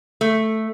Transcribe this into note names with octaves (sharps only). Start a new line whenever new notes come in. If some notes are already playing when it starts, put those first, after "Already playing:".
A3